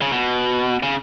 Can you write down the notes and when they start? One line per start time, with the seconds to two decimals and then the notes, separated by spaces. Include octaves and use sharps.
0.02 C#3
0.12 B2
0.83 C#3